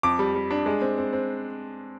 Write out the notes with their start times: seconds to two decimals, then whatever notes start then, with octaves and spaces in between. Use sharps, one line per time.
0.03 F2 D6
0.19 G3
0.35 G3
0.51 D4
0.66 G#3
0.81 C4
0.98 C4
1.13 C4